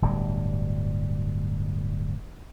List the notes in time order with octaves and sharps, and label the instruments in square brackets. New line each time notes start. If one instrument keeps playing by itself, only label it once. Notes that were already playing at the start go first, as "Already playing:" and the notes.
[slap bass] D1 G1 G2 G3